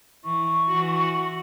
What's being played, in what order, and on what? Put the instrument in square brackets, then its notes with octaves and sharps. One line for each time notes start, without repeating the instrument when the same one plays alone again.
[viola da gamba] E3 [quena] C#6
[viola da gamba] E3 F#4